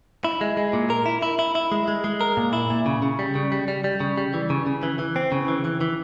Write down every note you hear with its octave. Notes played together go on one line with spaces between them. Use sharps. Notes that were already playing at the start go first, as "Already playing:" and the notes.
E4
G#3
G#3
A#2
A#4
E4
E4
E4
E4
G#3
G#3
G#3
A#4
A#2
E4
A#2
C#3
C#3
G3
C#3
G3
G3
G3
C#3
G3
E3
C#3
C#3
E3
E3
C4
C#3
E3
E3
E3